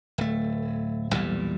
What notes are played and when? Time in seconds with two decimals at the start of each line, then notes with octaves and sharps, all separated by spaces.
0.18 D1 A3
1.12 B1 E2 A#2 G3